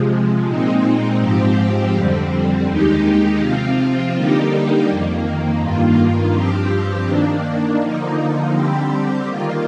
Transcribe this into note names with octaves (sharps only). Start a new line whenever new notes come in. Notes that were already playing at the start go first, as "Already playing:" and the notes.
Already playing: C3 F3 G#3
A#2 G#3 C4 D#4
G#2 F3 C4 G4
F2 D3 G3 C4
D#2 D#3 G#3 D#4 G4
C3 F3 C4 F4
D3 G3 A#3 D#4 G4
F2 D#3 A#3
G2 D#3 A#3 F4
G2 F3 C4 G4
D#3 A#3 D4
D3 F3 A#3 D#4
D3 G3 C4 G4
D#3 A#3 F4